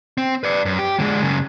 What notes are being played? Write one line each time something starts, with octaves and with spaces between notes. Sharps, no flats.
C4
B4 D5
F#2
G4
D3 G#3
F#2 C#3